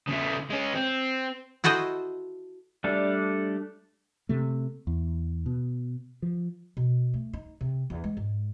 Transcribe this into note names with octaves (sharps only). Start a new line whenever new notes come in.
C#3 A3
G#3 C#4
C4
E4 F#4 A4 C5 D#5
G3 A3 D4 A4
C3 A3
E2
B2
F3
B2
A3
D#4
C3
E2
G#3
G#2